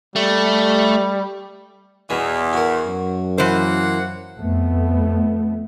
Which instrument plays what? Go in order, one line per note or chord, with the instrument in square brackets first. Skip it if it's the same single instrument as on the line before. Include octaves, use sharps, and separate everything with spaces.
[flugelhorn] G3 [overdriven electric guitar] A3
[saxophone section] E2 [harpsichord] B2 E3 G#5
[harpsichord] F#4 A#4
[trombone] F#2
[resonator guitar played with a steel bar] E3 C5 [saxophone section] A#3 F#5
[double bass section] F2 A3 B3